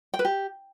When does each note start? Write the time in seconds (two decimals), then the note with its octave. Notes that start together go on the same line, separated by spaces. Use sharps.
0.14 G5
0.19 B4
0.25 G4